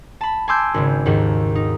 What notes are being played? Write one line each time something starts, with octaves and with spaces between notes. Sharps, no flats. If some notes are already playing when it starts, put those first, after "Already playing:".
A5 B5
G#5 A5 C6 D6 E6 G6
G#1 C#3
D#2 G#2 D#3
D#4